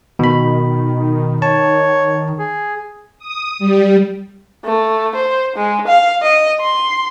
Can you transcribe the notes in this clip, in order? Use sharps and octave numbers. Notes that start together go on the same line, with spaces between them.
B2 D#3 B5
C#5 A5
G#4
D#6
G3
A3
C5
G#3
F5
D#5
C6